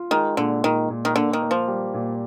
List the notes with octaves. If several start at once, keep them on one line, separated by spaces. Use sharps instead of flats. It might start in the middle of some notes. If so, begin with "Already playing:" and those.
Already playing: F4
D#3 G#3
A#2 D3
A#2 D#3
A#2
D#3
D3 A#3
D#3
A#3
F3
G3
A#2